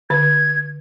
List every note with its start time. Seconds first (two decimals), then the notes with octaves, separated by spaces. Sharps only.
0.10 D3 B4 G#6